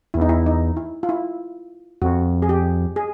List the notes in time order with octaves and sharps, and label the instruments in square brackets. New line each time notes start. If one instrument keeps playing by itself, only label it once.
[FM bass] E2 [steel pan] E4
[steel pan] D#4
E4
D#4
E4
F4
E4
[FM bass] F2 [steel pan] F#4
[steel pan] G#4
G4
G#4